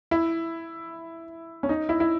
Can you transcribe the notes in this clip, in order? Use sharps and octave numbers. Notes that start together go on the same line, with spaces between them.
E4
C#4
D#4
E4
E4